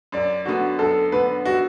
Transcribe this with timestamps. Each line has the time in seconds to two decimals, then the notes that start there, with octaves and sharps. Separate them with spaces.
0.12 F#2 D5
0.45 D3 B3 F#4
0.79 F#2 A4
1.12 D3 B3 B4
1.45 F#4